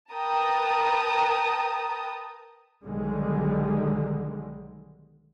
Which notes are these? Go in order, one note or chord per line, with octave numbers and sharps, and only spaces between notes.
A#4 B4 G5 A5 A#5 D#6
B1 D3 D#3 G3 G#3